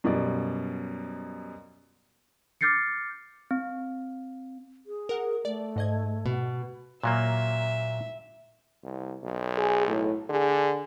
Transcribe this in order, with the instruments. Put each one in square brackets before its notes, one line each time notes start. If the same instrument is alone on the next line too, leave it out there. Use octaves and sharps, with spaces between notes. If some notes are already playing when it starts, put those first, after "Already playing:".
[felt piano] F#2 B2 G3 D5
[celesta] D6 F6 G6 A6 C7 C#7
[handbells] C4
[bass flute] G#4
[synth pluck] A#4 F#5
[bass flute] A3 [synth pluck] D5
[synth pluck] G#2 D#5 G#6
[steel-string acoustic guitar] B2
[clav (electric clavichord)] A#2 F#3 A#3 [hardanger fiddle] E5
[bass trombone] C2
B1
[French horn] G#4
A2
[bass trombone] D3 [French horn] G#4